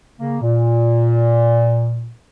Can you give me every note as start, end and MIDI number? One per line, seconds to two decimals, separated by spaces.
0.18 0.37 49
0.18 0.37 58
0.41 2.10 46